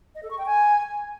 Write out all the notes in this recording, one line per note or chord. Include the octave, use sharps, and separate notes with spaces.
D#5
A4
C#6
G5
G#5